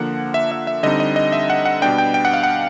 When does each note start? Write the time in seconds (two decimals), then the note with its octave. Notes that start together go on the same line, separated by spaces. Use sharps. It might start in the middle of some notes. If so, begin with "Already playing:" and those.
Already playing: D3 F3 A#3 F#5
0.34 E5
0.51 E5
0.67 E5
0.83 D3 G3 C4 D#4 D#5
1.00 D#5
1.16 D#5
1.32 E5
1.50 F#5
1.66 F#5
1.81 B2 G3 B3 D4 G5
1.98 G5
2.14 G5
2.25 F#5
2.33 F5
2.43 F#5